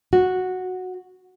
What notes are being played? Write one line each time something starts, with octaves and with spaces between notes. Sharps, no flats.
F#4